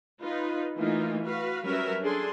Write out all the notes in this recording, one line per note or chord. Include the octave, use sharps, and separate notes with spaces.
D#4 F4 B4
E3 A3 A#3 D#4 F4
F#4 B4 F5
F#3 G3 C#4 A#4 B4 E5
D4 G#4 A4 C6